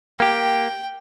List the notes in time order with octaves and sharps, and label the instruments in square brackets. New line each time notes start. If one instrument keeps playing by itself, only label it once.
[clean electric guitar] A#3 G4 [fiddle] G5